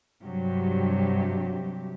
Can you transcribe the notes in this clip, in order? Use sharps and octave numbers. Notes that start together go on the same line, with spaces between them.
G2 C3 F#3 G4